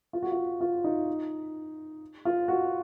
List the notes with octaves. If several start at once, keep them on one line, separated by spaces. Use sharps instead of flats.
F4
F#4
F4
F4
D#4
F4
F#4